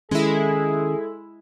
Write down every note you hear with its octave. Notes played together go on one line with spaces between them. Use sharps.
D#3 G#3 C#4 E4 G#4 A4